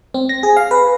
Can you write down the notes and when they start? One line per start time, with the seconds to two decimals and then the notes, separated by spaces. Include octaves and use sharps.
0.14 C4
0.29 A#6
0.43 G#4
0.57 F5
0.71 B4